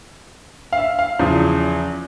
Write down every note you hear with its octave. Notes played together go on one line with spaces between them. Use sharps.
F5
E5
F5
E2 C#3 F3